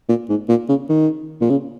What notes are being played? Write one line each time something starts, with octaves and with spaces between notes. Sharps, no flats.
A#2
G#2
A#2
C#3
D#3
A#2
C#3